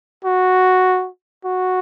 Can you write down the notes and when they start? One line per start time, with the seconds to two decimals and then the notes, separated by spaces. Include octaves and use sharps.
0.25 F#4
1.45 F#4